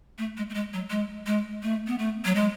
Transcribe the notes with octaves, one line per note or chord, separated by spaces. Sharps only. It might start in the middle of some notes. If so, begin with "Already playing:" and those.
A3
G#3
A3
G#3
F#3
G#3
G#3
A3
B3
A3
F#3
G#3